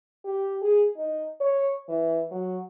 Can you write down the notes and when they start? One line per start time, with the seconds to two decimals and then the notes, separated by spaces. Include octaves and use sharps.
0.25 G4
0.62 G#4
0.96 D#4
1.41 C#5
1.88 E3
2.31 F#3